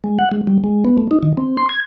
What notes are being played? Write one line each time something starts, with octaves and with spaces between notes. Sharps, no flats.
G#3
F#5
G#3
G3
G#3
B3
A3
D#4
D#3
C4
C6
G#6